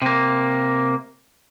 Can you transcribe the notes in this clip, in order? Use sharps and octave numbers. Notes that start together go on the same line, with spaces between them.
C3 A#3